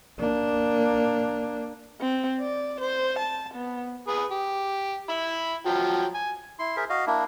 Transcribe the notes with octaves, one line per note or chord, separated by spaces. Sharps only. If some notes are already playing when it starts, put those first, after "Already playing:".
A#3 D4
C4
D5
C5
A5
B3
G#4 B4
G4
E4 B5
F3 F#3 G5
G#5
E4 C6
G#4 A#4 C5 E5
F#4 D#5 F5
A#3 D4 E4